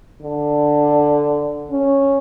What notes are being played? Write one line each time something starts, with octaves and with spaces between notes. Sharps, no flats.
D3
C#4